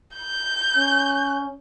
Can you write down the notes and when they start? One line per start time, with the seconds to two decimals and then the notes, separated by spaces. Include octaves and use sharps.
0.16 G6
0.76 C#4